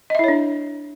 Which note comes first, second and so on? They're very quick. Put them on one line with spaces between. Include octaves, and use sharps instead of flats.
D#5 E5 E4 C#5 D4